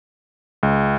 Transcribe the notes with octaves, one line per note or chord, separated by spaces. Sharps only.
C#2